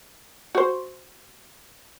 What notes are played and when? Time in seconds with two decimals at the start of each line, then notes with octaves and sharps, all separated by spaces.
0.55 F#4 C5